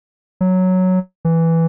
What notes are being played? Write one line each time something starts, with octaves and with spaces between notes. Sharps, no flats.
F#3
E3